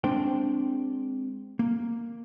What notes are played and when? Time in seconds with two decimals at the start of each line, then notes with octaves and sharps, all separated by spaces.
0.04 G#3 C4 D4 C5 G5
1.59 A#3